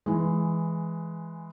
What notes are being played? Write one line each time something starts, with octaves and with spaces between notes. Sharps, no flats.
E3 G#3